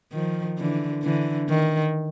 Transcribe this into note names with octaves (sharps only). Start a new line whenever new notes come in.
D#3 F3
D3 E3
D3 E3
D#3